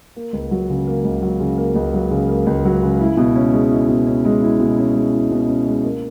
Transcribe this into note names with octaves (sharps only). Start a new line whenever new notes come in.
A#3
C#2
F#3
C#3
A#3
C#2
F#3
C#3
A#3
C#2
F#3
C#3
A#3
C#2
F#3
C#3
E4
B2
C#4
G#3
E4
B2
C#4
G#3
E4
B2
C#4
G#3
E4
B2
C#4
G#3
A#3